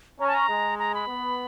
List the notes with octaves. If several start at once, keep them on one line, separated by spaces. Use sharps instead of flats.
C#4 A#5
A5
A#5
G#3
A#5
B5
B3